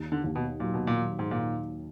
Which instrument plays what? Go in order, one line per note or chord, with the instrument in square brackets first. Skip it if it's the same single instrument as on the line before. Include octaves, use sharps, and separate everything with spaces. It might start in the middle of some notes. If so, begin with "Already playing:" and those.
Already playing: [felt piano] D#2
[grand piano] D3
[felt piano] D#2
[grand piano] B2
[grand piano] A#2 [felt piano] F#3
[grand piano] B2
A#2
[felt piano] F#3
[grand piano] G#2
[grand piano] A#2 [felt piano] D#3